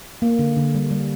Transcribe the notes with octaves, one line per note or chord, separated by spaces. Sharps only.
A#3
D3
D3
G3
G3